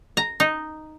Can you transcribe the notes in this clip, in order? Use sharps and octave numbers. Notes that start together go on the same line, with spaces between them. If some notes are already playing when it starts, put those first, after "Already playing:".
A#5
D#4